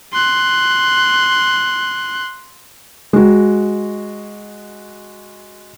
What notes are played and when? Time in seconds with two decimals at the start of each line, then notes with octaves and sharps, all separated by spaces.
0.13 C6 F#6
3.13 G#3 F#4